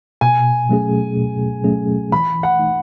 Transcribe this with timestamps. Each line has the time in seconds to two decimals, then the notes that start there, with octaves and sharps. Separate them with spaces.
0.21 B2 G#5
0.69 F#3 A3 C#4 G#4
1.16 B2
1.64 F#3 A3 C#4 G#4
2.12 E3 B5
2.43 F#5
2.59 A3 D#4